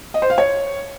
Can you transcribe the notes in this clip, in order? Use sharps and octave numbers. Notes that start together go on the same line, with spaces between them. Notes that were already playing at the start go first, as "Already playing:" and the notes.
D#5
C5
F5
C#5